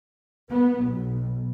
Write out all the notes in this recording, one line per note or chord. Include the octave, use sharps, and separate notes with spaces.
B3
B1